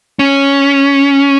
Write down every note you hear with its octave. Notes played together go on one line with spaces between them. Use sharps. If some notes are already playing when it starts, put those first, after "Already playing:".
C#4